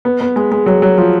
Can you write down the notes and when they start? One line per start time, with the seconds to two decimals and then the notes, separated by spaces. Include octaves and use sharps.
0.05 B3
0.21 B3
0.36 G#3
0.52 G#3
0.66 F#3
0.82 F#3
0.98 F3